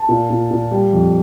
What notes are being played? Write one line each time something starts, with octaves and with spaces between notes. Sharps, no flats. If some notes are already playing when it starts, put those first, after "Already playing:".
Already playing: A5
A#2
A#2
A#2
G3
F2